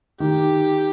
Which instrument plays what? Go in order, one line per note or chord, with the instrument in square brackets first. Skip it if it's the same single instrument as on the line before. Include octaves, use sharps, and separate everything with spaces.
[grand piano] D#3 [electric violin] G4